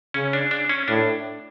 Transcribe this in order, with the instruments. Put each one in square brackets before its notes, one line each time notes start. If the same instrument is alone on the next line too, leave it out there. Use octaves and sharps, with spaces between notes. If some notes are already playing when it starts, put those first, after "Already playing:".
[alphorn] C#3 [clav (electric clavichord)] C#4
[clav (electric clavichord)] D4
D4
C#4
[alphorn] A2 [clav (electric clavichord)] D4